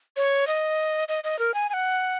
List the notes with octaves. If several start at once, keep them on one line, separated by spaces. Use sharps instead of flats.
C#5
D#5
D#5
D#5
A#4
G#5
G#5
F#5